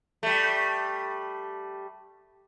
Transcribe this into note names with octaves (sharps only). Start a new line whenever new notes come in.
G3 A3